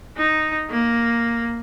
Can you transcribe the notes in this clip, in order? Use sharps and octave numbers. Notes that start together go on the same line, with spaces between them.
D#4
A#3